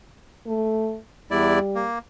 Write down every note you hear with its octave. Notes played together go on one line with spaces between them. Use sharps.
A3
E2 G3 E4 D5
A#3